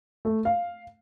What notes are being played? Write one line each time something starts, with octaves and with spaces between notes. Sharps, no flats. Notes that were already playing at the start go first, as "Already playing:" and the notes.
A3
F5